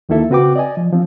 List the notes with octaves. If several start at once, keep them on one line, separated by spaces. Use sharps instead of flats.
D2 D#3 A#3 E4 A4 E5
C#3 C4 F#4 B4 G5 D6
D5 D#5 G#5
F3
E3 F3 C4